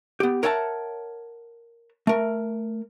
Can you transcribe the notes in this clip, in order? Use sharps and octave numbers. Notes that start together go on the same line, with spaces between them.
B3 G4
A#4 C#5 E5 F#5 G5 A5
A3 A#4